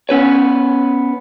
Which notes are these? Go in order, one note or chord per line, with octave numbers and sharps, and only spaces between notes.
B3 C#4 B4 C#5